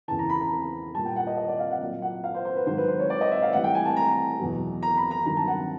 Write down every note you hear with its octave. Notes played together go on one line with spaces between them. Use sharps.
E2 C#3 E3 A5
A#5
B5
A#5
A#2 G3 A5
G5
F#5
D#5
D#5
D5
F5
F#5
A#2 F#3
F#5
F5
C5
C5
B4
G#2 D#3 F#3 C5
B4
C5
C#5
D5
D#5
E5
F5
A2 E3 G3 F#5
G5
G#5
A5
A#5
E2 B2 F#3
A#5
B5
A#5
G2 D#3 F#3 A#5
A5
F#5